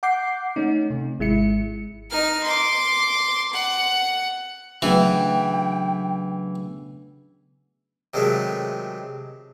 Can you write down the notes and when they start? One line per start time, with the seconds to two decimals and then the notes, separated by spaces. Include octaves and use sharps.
0.03 F#5 D6 G6 C7
0.56 A3 C#4 D#4
0.90 C3
1.19 G#1 G#3 E4 C#7
2.11 D#4 F6
2.44 C6 D6
3.53 F#5
4.82 C#3 E3 F#3 A3 B3 D4 G5
8.14 C3 D#3 F#3 G#3 A3